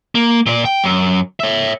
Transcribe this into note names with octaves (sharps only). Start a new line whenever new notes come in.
A#3
A#2 D5
G5
F#2
C#5 E5